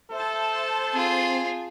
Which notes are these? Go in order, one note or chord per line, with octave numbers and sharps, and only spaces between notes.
A4 C5 E5 A5
C4 F4 G#4